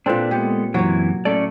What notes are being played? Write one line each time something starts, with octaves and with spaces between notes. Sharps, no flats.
A#2 C4 D4 A4 B4
G#3 B3 G4 A4
F#2 C3 E3 F#3 C#5
A2 A3 C#4 D5